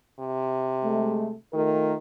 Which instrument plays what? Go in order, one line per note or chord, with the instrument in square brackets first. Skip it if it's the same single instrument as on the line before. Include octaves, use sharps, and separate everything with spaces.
[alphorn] C3
[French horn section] G#3 A3
[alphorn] D#3 [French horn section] A3 F4 A#4